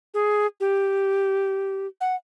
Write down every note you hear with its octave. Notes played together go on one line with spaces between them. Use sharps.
G#4
G4
F#5